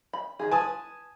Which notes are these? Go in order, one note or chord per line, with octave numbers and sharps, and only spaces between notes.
B5
D#3 G#4
B4 G#5 A5 D#6